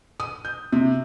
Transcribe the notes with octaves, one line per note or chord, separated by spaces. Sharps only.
D#6
G6
C3